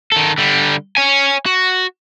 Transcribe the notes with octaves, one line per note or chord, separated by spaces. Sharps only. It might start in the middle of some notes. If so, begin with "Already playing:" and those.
D#3 A4
D3 G3
C#5 G#5
F#4